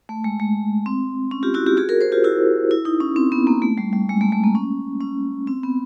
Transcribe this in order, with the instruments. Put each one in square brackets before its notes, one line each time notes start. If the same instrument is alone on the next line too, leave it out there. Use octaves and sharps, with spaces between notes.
[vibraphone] A3
G#3
G#3
C4
C#4
F4 G4
E4 F#4
F4 G4
F#4 G#4
G#4 A#4
A#4 C5
F4 G4
E4 F#4
E4
D#4
C#4
C4
B3
A#3
A3
G3
G3
G#3
A3
A3
A#3
C#4
C#4
C4
B3